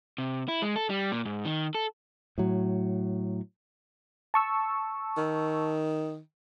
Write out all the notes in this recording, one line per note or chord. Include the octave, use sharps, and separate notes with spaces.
C3
E4
G#3
A4
G3
A#2
G#2
D#3
A4
A2 F#3
A5 C#6 E6
D#3